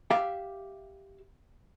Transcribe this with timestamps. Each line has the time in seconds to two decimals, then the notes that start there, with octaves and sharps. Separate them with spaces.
0.11 G4 E5 F5